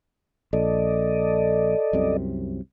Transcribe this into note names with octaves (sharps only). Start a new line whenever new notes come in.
A#1 A4 D5 D#5
C2 F#2 C3